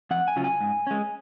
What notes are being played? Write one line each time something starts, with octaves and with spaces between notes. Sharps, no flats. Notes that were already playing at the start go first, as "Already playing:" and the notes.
F2 F#5
G#5
C#3 F#3 C#4 F4
G#5
G#2
G#3 C#4